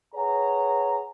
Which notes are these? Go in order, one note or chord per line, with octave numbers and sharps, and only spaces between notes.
G#4 B4 C#5 F#5 A#5